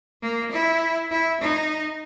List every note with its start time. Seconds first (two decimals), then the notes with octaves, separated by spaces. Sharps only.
0.22 A#3
0.52 E4
1.11 E4
1.41 D#4